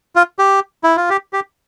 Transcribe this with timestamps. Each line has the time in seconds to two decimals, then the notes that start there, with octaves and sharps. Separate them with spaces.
0.16 F4
0.39 G4
0.84 E4
0.97 F4
1.10 G4
1.33 G4